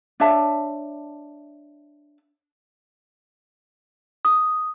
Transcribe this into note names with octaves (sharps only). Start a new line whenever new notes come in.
D4 C#5 E5 A5
D#6